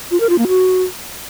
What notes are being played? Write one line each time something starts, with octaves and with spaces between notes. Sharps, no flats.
F4
A#4
F4
A#3
F#4